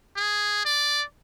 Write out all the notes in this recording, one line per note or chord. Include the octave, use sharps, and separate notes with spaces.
G#4
D5